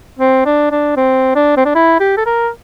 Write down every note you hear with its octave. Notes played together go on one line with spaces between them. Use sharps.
C4
D4
D4
C4
D4
C4
D4
E4
G4
A4
A#4